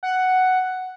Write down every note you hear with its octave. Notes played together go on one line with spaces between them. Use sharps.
F#5